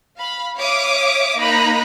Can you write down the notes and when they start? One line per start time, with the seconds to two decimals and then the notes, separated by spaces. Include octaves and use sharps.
0.18 F5 B5
0.58 C#5 E5 F5 D6 D#6
1.39 A#3 D#4 A#5 B5 F#6